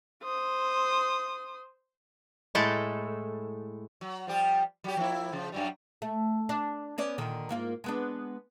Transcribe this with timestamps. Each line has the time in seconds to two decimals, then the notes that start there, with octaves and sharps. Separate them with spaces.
0.24 C5 D#6
2.55 A2 G#3 A3 E4 A4
4.01 F#3
4.27 F3 G3 G4
4.84 F#3 G4
4.97 F3 A#3 E4
5.32 C#3 F3
5.52 F#2 F#3 G3
6.02 A3
6.49 D4
6.98 B3 C#4 D5
7.18 A#2 D3 D#3
7.49 G#2 A#3 F4
7.84 G#3 B3 D4